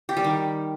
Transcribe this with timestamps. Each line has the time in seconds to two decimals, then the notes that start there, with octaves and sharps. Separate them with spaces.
0.09 G4
0.17 G3
0.24 D#3